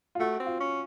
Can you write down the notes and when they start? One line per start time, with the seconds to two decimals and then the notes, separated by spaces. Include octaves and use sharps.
0.15 F4
0.19 A3 F#4
0.39 C4
0.46 F4
0.60 C#4